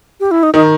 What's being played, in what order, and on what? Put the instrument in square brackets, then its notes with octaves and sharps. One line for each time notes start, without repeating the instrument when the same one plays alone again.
[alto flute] G4
E4
D#4
[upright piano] D#3 [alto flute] D#4